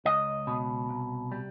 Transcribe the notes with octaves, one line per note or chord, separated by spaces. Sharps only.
C#2 D#5
B2
C2
G3